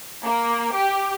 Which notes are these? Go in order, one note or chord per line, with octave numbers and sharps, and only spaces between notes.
A#3
G4